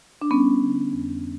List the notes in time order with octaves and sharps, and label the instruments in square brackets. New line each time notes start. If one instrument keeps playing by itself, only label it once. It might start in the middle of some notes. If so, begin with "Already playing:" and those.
[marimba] D4
G3 B3 C#4
D3
F2